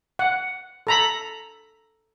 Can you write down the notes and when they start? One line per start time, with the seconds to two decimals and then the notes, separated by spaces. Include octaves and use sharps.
0.19 F#5
0.87 A4 A#5 B5